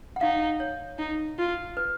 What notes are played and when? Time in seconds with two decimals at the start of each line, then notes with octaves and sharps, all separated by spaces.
0.16 F#5
0.21 D#4 F5
0.60 C#5
0.99 D#4
1.38 F4
1.77 B4